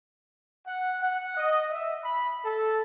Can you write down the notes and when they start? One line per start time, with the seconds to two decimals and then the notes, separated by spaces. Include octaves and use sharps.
0.66 F#5
1.01 F#5
1.37 D#5
1.72 E5
2.03 B5
2.44 A4